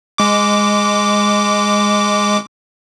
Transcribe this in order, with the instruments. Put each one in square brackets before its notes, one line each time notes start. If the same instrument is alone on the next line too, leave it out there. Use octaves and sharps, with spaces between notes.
[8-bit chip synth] G#3 D6